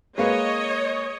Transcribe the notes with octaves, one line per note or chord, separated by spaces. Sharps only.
G#3 A#3 B4 C#5 D#5